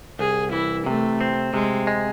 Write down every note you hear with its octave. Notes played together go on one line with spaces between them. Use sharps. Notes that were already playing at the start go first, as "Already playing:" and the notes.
C2 G#4
E3 E4
C3 A3
C4
C3 G#3
G#3